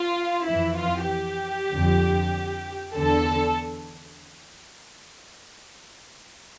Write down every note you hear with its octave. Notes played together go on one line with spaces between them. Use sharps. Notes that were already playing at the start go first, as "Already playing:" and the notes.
Already playing: F4
F2 E3 E4
F4
G4
F2 D3
E2 D3 A4